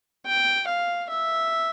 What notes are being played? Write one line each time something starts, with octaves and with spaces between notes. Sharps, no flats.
G5
F5
E5